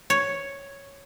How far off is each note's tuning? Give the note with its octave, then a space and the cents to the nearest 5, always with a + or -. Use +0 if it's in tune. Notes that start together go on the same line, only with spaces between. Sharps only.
C#5 +0